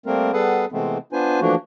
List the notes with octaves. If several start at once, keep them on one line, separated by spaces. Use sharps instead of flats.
G3 A3 A#3 C4 A#4
G3 B3 G#4 A4 B4 F#5
C3 E3 G#3 A3 B3 C4
B3 D4 F4 B4 C5 G#5
E3 F3 A3 A#3 D4 F#4